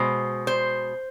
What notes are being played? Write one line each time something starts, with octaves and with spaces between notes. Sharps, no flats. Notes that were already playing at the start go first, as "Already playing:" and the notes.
Already playing: B2 G#3 C5
C5